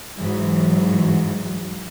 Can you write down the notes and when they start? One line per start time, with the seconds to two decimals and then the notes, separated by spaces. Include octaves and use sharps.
0.19 G#2 E3 F#3